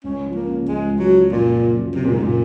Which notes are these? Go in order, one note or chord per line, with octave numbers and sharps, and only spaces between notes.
C#2 C#4
F3
A#3
C#3
C#2 G#3
C#2
F#3
F3
F#1 A#2
C#3
F#2
F#1 C3
A#2
F#1 G#2
A#2